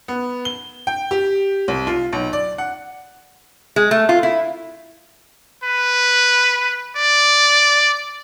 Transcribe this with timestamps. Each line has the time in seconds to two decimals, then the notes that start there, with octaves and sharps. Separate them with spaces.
0.08 B3
0.45 G7
0.87 G5
1.11 G4
1.68 C2
1.87 F4
2.13 B1
2.33 D5
2.58 F#5
3.76 G#3
3.91 A3
4.09 F4
4.23 E4
5.64 B4
6.97 D5